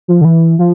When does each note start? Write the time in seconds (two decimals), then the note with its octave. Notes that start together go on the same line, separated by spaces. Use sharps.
0.08 F3
0.21 D3
0.25 E3
0.59 F3